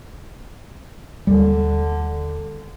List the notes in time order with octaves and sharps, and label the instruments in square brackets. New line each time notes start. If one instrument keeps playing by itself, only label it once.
[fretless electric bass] D#2 G3 [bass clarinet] D3